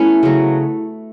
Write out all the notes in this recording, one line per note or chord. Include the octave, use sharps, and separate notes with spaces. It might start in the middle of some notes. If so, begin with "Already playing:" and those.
Already playing: A3 B3 C#4 E4
C#3 F#3 A3